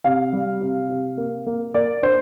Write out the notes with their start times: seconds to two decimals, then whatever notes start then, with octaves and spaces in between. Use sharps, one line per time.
0.04 C3 F5
0.33 G3
0.61 C3
0.89 C3
1.17 A#3
1.46 A#3
1.74 A#3 D5
2.02 D4 C5